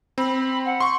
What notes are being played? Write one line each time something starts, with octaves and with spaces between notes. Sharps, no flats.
C4 B5
F#5
C6 C#6